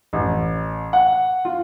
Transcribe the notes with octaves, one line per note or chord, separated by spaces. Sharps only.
A1
F#5
F4